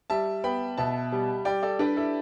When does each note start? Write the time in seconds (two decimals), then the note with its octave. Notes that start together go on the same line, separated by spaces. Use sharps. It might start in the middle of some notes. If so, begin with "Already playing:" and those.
0.10 G3 E5 A5
0.44 B3 G5 B5
0.77 B2 E5 A5
1.12 G3
1.45 G3 D5 G5
1.63 A4 D5
1.79 D4 G4 B4
1.96 E4 A4